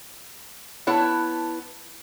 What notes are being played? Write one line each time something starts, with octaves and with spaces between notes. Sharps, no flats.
B3 E4 C#5 A5